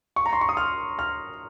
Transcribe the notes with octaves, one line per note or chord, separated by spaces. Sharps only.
C#6
A#5
C6
C#6
D#6
F6
F6